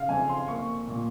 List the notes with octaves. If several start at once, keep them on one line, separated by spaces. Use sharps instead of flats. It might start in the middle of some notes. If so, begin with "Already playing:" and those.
Already playing: C#3 F5
F2 G#5
C6
A#3 C#6
A#2